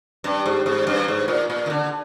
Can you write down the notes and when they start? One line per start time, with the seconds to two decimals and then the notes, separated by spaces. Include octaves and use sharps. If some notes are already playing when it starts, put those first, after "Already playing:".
0.24 G2
0.46 G#2
0.66 G#2
0.87 G2
1.08 G#2
1.28 A#2
1.50 A#2
1.66 D#3
1.70 D3